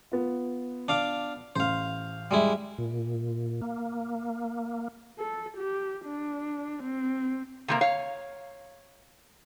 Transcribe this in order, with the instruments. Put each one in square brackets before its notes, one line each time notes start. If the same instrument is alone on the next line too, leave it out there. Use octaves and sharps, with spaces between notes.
[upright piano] B3 F4
[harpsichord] D4 F5 D6
[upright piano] A1 [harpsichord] C5 F5
[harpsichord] G3 G#3 E4
[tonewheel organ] A#2
A#3
[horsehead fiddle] A4
G4
D4
C4
[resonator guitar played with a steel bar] C3 G3 A#3
C#5 F5